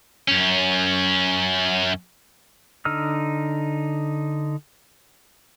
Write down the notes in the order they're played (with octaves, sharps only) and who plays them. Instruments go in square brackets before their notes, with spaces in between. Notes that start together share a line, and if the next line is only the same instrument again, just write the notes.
[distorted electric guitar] F#2 C#4
[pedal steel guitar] D3 D#4 E6 F6